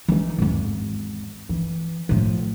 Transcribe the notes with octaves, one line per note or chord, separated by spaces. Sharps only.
E3 D#4
G#1 E2
E3
A2 F3